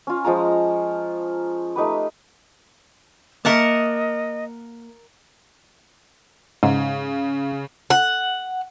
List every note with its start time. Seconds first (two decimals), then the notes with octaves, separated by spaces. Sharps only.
0.07 C#4 F4
0.25 F3 G#3 F4 A#5
1.76 A3 D#4 G4 B4
3.45 A#3 A#4 D#5 E5 F#5 A5
6.63 G#2 C#3
7.90 F#5